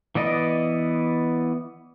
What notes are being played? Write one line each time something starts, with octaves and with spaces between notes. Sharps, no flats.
E3 B3 D5 D#5